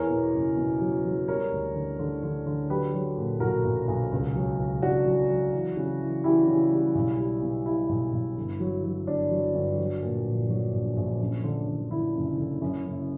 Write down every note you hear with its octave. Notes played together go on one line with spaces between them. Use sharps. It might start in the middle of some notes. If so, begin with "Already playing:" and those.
Already playing: E2 A#4 C#5
B2
F#1
B2
F#3
F#3
G3 A#4 C#5
D2
D3
D3
D3
D3
F#3 G4 B4
F#3
A#2
B1 F#4 A#4
B1
B1
C#2
F#3
C#2
C#2 D4 F#4
F#3
F#3
E3
C#3
E3
E3 E4 G4
C#3
G3
B1
G3
B2
G3 E4
B1
B1
G1
F#3
F#3
G1 D4
F#3
G1
F#3
A#2
A#1
F#3
A#1
A#1
F#2
D3
D3
D3 E4
F#1
D3
F#2
F#1